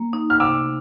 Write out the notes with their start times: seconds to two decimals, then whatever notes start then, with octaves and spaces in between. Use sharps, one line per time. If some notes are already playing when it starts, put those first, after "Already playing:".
Already playing: A#3
0.13 D#4
0.30 F6
0.40 C3 D6 E6